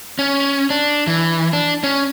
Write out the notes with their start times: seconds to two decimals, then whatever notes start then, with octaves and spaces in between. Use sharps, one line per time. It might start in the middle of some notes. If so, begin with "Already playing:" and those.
0.19 C#4
0.70 D4
1.07 E3
1.53 D4
1.84 C#4